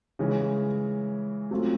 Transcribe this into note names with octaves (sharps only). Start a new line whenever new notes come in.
C#3 E3 G#3 C#4
F#3 A3 C4 F4